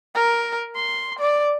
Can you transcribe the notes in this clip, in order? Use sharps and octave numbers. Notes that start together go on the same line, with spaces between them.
A#4
C6
D5